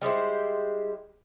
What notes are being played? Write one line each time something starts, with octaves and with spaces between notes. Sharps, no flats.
G3 G#3 E4 C5